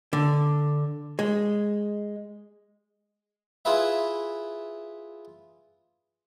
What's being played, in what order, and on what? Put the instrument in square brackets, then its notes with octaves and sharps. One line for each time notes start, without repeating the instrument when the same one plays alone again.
[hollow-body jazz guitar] D3
G#3
[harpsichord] E4 F4 G#4 B4 E5